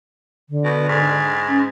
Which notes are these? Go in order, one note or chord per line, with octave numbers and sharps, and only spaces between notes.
D3
B2
G#2
C#4